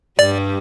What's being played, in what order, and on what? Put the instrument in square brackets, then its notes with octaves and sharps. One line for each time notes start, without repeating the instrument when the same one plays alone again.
[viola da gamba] G2 G3 [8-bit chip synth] D5